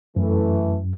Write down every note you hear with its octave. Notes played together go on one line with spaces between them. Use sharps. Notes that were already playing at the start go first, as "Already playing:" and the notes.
F#2 E3 A3